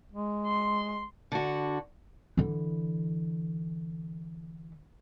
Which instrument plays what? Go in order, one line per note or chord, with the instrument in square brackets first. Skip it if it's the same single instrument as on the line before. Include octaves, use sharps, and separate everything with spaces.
[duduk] G#3
[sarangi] C6
[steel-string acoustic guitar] D3 F#4
[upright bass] D3 E3